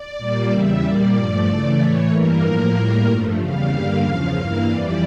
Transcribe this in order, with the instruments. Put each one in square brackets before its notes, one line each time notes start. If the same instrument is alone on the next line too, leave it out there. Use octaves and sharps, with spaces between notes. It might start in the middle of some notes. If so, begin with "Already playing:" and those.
Already playing: [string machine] D5
A#2 G3 A#3
E2 C#3 G3 E5
A#2 G3 A#3 D5
G2 F3 A3
C#3 E3 A3
A2 E3 A3 C#5
G2 E3 G3 A#3 A#4
A2 F3 A#3
A2 G3 A#3
G2 F3 A3
E2 C#3 G3 F5
G2 D3 G3 A#3
E2 C#3 F3
G2 E3 A#3
F2 E3 G3 D5